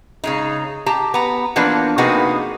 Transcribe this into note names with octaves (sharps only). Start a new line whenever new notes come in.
C#3 G#3 D#4
G4 A5 A#5
B3 A#5
E3 F3 A#3 B3 D4
C3 A#3 B3 D#4 F#4 G#4